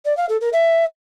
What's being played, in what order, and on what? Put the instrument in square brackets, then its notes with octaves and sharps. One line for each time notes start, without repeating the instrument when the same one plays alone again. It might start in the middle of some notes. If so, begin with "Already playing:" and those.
[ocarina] D5
F5
A4
A#4
E5